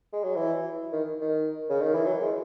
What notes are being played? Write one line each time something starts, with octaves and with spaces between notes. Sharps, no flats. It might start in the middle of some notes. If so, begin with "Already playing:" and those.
G#3
F#3
E3
D#3
D#3
C#3
D#3
E3
F#3
G#3